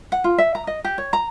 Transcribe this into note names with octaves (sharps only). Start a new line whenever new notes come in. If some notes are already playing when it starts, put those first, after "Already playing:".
F#5
F4
E5
A#5
D#5
G4
C#5
A#5